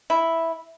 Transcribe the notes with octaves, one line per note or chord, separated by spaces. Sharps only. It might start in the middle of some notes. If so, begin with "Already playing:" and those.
E4